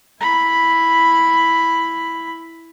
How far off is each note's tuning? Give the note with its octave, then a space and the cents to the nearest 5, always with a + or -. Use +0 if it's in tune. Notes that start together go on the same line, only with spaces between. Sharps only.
E4 +0 B5 +0